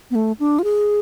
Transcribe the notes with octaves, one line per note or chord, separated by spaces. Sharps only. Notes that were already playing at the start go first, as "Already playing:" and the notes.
B3
A3
D4
F4
G#4